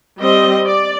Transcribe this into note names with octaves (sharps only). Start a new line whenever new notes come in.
G3 C4 D#5
D5